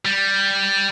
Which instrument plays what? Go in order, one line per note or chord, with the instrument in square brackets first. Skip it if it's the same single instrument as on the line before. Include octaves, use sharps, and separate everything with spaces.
[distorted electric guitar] G3